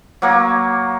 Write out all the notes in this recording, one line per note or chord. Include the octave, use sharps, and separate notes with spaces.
F#3 A#3